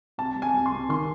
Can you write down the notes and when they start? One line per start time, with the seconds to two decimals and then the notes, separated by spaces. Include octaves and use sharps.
0.18 C2 A5
0.36 C2
0.42 G#5
0.54 C2
0.66 C6
0.72 C2
0.89 D#3 C6